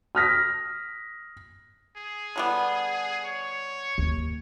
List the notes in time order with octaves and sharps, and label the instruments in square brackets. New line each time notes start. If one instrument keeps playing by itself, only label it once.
[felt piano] D#6 F6 A#6 B6
[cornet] G#4
[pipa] D3 G3 B3
[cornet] C#5
[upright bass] D#2